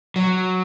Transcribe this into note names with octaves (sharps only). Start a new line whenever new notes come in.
F#3